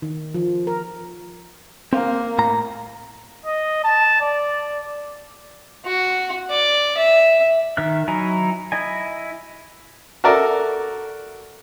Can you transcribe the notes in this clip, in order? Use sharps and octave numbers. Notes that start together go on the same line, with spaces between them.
D#3
F3
A#4
A#3 C4
A2 A#5
D#5
A5
D5
F#4
D5
E5
D#3 E5 F6 F#6
F#3 D#4 E4 G#5 A#5
E4 D#5 G#5
F#4 A4 A#4 D5 E5 D6